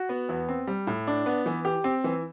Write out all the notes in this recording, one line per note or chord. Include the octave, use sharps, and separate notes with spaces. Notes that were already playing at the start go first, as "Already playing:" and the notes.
Already playing: F#4
B3
E2
C4
G3
A2
D4
B3
E3
G4
C4
E3